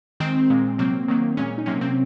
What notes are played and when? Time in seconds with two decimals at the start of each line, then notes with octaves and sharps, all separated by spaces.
0.20 D#3 G#3 C4
0.50 A#2 G#3
0.78 C3 F#3 A#3 C4
1.08 D#3 F#3 A#3
1.37 A#2 G#3 C#4
1.58 D#4
1.66 C3 F#3 A#3 C#4
1.81 C4